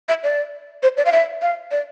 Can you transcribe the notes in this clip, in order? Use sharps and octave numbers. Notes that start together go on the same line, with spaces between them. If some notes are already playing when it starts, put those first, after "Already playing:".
E5
D5
C5
D5
F5
E5
F5
D5